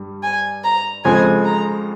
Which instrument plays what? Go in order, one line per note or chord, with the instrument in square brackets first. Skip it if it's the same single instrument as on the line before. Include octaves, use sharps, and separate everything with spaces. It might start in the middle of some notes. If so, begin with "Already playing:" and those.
Already playing: [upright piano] G2 G3
[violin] G#5
A#5
[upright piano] F2 C#3 F3 G#3 C4 [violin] G#5
[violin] A#5